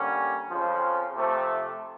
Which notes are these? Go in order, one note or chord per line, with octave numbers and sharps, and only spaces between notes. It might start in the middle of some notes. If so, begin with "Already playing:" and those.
Already playing: D3 G3 A#3 C#4
F2 C#3 F3
C3 F3 A3